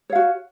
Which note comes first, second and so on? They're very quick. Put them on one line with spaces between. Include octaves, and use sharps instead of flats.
C#5 F5 F#4